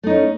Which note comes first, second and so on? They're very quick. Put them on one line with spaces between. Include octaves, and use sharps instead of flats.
A3 D#4 C#4